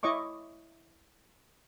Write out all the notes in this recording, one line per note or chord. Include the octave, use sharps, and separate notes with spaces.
E4 C#5 D#5 C#6 D6